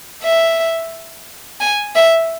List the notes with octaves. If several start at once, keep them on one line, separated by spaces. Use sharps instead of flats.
E5
G#5
E5